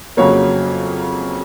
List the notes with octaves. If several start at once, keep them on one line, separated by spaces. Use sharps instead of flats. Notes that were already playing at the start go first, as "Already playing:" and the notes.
F2 C#3 F#3 A#3 C#5